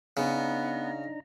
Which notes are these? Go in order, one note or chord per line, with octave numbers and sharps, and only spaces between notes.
C#3 B3 D4 D#4 A#5